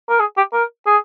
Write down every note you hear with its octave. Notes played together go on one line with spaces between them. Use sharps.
A#4
G#4
G4
A#4
G#4